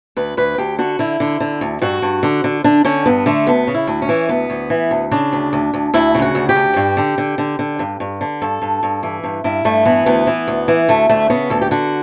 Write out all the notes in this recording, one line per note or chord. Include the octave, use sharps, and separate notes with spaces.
D2 B4
D2 B4
D2 G4
D3 F#4
D3 E4
D3
D3
D2
G2 F#4
G2
D3
D3
D3 D4
D3 C#4
G2 B3
D3 A3
D2 B3
C#3
E4
D2
C#4
E3
D2 B3
D2
E3
D2
C#3 D4
D2
D2
D2
D2 E4
C#3
F#4
D2
G4
D2
G2
D3
D3
D3
D3
G2
G2
D3
G2 A4
G2
G2
E3
G2
G2 E4
G2 A3
E3 B3
D2 B3
E3
D2
E3
D2 A3
D2 A3
C#3 B3
D2 A4
G4
D3 F#4